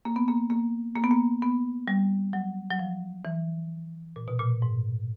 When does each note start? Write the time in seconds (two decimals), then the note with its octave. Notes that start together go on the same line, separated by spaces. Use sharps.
0.05 A#3
0.16 B3
0.28 A#3
0.50 A#3
0.96 A#3
1.04 B3
1.11 A#3
1.42 B3
1.88 G3
2.33 F#3
2.71 F#3
2.79 F3
3.25 E3
4.16 A#2
4.28 B2
4.40 A#2
4.62 G#2